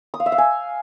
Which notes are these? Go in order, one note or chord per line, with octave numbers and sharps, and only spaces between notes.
D#6
F5
E5
F5
G#5